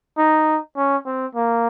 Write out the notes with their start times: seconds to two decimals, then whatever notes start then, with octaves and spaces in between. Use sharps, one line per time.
0.18 D#4
0.77 C#4
1.06 C4
1.35 A#3